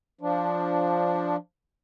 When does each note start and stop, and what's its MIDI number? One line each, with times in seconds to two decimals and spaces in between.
0.21 1.36 53
0.21 1.36 62